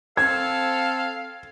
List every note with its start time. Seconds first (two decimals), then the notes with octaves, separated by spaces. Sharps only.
0.17 C4 A4 F5 G#6